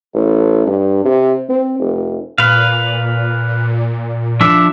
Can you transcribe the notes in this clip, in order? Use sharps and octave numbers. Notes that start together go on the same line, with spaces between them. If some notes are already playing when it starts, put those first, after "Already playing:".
A1
G2
C3
C4
F1
A#2 B4 F5
F3 D4 E5